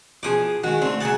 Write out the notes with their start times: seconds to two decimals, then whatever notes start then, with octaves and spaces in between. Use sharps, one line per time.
0.23 B2 F3 G#4 D6 D#6
0.64 D#3 G#3 F#4
0.82 D3 A3 C4
1.01 B2 F#3 G#4 F#5 A5